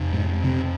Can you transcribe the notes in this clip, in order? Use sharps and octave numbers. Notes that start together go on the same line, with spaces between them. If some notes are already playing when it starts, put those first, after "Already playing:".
Already playing: F2 C3
G#2 G#3
C3 C4